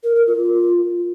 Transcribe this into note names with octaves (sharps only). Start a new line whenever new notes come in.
A#4
A#4
F4